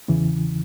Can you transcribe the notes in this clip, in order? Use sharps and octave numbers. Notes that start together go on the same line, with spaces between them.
E2 C#3 E3